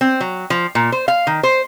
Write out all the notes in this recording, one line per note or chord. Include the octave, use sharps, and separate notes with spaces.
C4
F#3
F3
A#2
C5
F5
D#3
C5